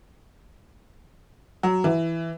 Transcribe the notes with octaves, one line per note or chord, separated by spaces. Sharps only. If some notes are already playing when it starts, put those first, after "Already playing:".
F#3
E3